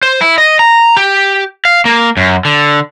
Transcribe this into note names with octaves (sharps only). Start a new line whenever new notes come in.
C5
E4
D#5
A#5
G4
F5
A#3
F#2
D3